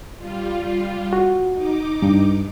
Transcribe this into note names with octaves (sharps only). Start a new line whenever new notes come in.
G3 F4
F#4
D#4 D6
G2